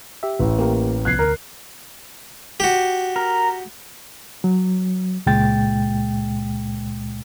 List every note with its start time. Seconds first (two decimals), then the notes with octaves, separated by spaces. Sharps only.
0.23 G4 E5
0.39 A1
0.59 A#3 G4 A#4
1.05 C2 F3 B3 F#6 G#6 C7
1.19 D2 A#4
2.60 F#4 G4
3.16 A#4
4.44 F#3
5.26 C#2 A#2 G#3 G5 A6